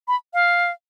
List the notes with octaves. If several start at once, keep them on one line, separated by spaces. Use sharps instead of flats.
B5
F5